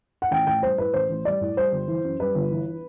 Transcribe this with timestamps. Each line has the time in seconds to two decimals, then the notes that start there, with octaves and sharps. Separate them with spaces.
0.22 F#5
0.31 A1 G5
0.47 A1 G5
0.62 G3 C5
0.78 A2 B4
0.93 A1 C5
1.10 A1
1.25 G3 D5
1.41 A2
1.57 G3 C5
1.72 G1
1.88 E3
2.04 F#2
2.20 G3 B4
2.35 G1
2.51 E3